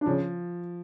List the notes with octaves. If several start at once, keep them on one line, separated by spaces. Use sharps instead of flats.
D4
C#3 F3 C#4